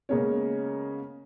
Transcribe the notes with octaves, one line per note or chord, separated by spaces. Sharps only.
C#3 G#3 A#3 B3 C#4 C#5